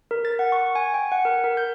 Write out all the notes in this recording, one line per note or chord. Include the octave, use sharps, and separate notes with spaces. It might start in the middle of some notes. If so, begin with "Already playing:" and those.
A#4
A6
F#5
C#6
G#5
G5
F#5
A#4
A#4
G6